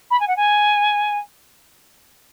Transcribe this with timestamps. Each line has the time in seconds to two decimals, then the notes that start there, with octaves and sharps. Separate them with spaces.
0.10 B5
0.20 G#5
0.27 F#5
0.36 G#5